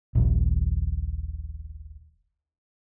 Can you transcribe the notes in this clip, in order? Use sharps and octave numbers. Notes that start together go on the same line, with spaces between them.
D#1 A#1